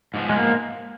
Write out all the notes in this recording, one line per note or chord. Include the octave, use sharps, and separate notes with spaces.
G#2 F3 B3
G#3
A#3